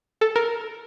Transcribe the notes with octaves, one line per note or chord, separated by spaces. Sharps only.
A4
A#4